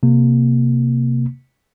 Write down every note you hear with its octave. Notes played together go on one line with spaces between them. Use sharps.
C3 A#3